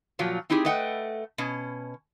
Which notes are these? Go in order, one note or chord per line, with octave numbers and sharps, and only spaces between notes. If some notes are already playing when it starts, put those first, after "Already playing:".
A#2 F3 F#3 F4
C4 D#4 E4 G4 G#4
A3 B4 D#5 F#5 G5
B2 C#4